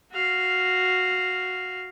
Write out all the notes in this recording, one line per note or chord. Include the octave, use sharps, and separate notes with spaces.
F#4 F5